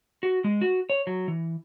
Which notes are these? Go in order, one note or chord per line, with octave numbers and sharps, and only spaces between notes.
F#4
G#3
F#4
C#5
F#3
E3